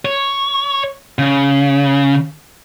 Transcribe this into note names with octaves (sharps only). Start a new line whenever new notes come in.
C#5
C#3